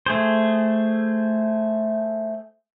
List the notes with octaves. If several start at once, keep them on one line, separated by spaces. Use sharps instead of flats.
A3 G#4 C5